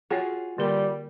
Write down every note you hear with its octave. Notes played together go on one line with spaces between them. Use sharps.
F4 F#4 G#4 C#5 G5
D3 G3 A#3 A#4